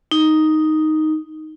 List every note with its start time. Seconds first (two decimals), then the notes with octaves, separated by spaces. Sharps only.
0.11 D#4